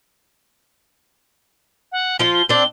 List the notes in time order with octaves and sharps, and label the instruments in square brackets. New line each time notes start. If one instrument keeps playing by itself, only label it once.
[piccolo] F#5
[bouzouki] F3 F4 [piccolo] G7
[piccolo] G7
[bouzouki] C4 D4 [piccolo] G7